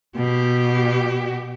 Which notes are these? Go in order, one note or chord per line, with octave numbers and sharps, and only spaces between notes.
B2 G4